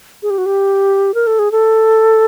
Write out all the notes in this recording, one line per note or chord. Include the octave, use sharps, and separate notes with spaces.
G#4
G4
F#4
G4
A#4
A4
G#4
A4